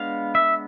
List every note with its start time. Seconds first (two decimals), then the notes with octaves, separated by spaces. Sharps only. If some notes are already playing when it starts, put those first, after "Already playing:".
Already playing: G#3 B3 D4 F5
0.35 E5